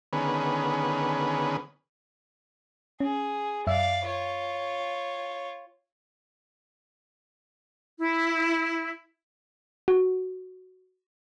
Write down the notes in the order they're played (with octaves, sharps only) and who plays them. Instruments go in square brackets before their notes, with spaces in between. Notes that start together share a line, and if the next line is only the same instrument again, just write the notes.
[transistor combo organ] D3 D#3 B3 C#4 G#4 B4
[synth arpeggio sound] C#4 [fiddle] G#4
[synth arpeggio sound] F#2 E5 [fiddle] D5 F5
[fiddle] F4 C#5
[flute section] E4
[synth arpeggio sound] F#4